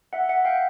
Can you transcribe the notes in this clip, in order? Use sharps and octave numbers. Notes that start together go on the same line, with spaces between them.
E5 F#5
E5 F#5
F5 G5